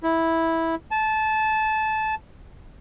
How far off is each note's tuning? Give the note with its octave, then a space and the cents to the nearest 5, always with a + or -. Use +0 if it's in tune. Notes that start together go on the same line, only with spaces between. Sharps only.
E4 -10
A5 -20